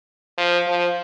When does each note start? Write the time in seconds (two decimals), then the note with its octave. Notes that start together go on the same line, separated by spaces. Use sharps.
0.38 F3
0.67 F3